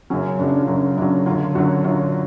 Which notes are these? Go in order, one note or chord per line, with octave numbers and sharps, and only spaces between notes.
F#2 C#3 F#3 C#4
F#2 C#3 F#3 D4
D4
F4
F#2 C#3 F#3
F#2 C#3 F#3 D4
F#2 D3 F#3 F4
F#2 D3 F#3 F#4
F#2 D3 F#3 F4